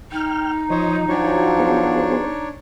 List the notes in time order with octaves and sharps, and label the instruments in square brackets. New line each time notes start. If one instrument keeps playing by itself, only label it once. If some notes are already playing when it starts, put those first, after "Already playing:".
[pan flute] D#4 [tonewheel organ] G5 F6
[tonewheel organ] F3 D#5 [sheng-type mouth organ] C5 C#5
[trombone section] F3 F#3 [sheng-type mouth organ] D4 C#5 [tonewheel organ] G#5
[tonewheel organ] B3 G#4 C5